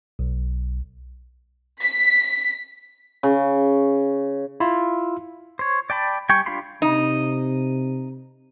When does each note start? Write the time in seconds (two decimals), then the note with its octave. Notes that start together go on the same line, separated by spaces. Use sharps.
0.19 B1
1.81 B6
3.23 C#3
4.60 E4 F4
5.59 C5 C#5
5.90 D5 G5 A5 B5
6.29 G3 G5 G#5 C#6
6.46 D4 F4 G4 B5 C6
6.82 C3 D#4